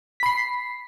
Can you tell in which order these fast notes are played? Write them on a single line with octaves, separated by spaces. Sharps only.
B6 B5 C7